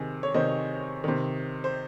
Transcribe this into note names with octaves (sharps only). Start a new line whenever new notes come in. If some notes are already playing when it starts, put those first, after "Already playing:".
Already playing: C3 D#3 G#4
C#5
C3 D#3 C5 D#5
C3 D#3
C5